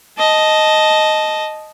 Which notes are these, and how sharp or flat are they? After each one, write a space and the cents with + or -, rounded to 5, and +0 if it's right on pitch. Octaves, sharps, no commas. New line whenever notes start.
D#5 +0 A5 -10